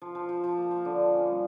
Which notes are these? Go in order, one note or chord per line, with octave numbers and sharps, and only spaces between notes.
F3
F3
F3
F3
A#3
F3
D3
F3
C#4
G3